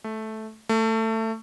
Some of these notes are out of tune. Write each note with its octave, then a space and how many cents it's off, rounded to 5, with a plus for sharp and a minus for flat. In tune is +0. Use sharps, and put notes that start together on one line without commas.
A3 -10
A3 +20